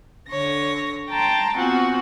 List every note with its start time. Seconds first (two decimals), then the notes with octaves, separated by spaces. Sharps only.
0.29 D3 C#5 A#6
1.09 G5 A5 A#5 C6 A6
1.57 B3 C4 F4 F#4 F#5 G#5